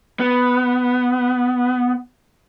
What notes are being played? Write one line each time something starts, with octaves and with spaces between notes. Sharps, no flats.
B3